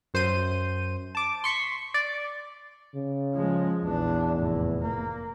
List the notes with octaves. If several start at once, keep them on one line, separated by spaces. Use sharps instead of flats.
F#2 C5 G6 D#7
A5 D6
C6 C#6 B6
D5
C#3
F3 G#3
A#1 E2 D4
F1 A2
A#3